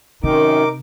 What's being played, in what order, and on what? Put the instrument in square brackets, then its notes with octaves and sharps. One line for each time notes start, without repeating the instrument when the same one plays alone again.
[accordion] F#2 D#3 [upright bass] C3 [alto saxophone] D#4 [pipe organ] A#4 D6